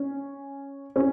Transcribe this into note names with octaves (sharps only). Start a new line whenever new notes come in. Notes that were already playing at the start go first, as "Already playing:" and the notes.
Already playing: C#4
C#4